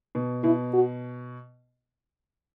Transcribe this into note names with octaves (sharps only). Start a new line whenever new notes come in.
B2
B2 E4
F#4